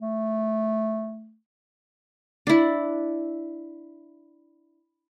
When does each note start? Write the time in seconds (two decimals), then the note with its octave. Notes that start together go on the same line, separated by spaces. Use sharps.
0.01 A3
2.47 D4 E4